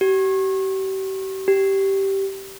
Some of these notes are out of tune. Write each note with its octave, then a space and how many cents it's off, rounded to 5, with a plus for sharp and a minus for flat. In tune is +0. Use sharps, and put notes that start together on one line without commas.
G4 -40
G4 -10